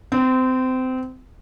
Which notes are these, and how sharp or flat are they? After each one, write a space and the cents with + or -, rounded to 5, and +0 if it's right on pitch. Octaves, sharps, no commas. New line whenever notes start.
C4 -25